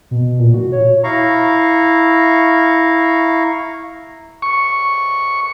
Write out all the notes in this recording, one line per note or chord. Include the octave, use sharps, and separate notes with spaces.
B2
A#2
F#4
C#5
E4 F5 A#5 C#6
C#6